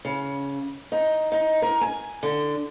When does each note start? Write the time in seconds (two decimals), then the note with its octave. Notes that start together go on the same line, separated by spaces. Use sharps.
0.05 C#3
0.92 D#4
1.32 D#4
1.62 A#4
1.81 G#5
2.23 D3